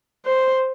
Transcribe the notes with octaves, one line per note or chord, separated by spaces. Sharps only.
C5